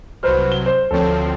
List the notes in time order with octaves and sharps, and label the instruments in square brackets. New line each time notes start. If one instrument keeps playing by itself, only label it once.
[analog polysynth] C2 F#3 [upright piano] B4 C5 F6
[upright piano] G7
C5
[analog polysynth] D2 F3 C4 [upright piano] A4 C#5